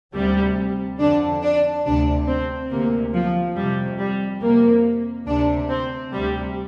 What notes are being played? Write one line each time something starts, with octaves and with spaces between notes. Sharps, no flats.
D2 C3 G3
F2 D3 D4
D4
D2 C3 D4
C4
D2 C3 A#3
F3
F2 C3 G3
G3
F2 C3 A#3
D2 C3 D4
C4
D2 C3 G3